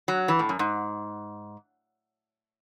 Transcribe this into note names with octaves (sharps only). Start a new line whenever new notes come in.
F#3
E3
A2
F#2
G#2